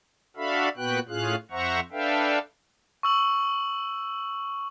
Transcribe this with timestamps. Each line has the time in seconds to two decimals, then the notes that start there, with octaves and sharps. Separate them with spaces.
0.37 D4 F#4 A4 E5 F5 B5
0.77 A#2 B3 F#4 B4 G5 F#6
1.09 A2 C#4 F4 G#4 F5 F#6
1.51 F2 C5 E5 F#5 A#5 C#6
1.92 D4 A4 B4 E5 F5 G5
3.03 C#6 E6 F#7